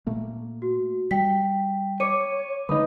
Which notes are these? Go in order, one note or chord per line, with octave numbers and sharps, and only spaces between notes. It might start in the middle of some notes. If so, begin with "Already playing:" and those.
A#2 A3 A#3
F#4
G3 G5 B6
C#5 D6 C#7 D#7
D3 G#3 A3 D#4 B4 D#6